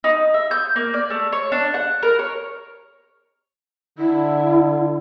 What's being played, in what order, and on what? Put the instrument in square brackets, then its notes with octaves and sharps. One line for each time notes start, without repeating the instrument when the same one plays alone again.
[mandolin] D#4
E5
G6
A#3
D5
A3
C#5
D4
F#5
A#4
C#5
[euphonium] D3 [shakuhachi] E4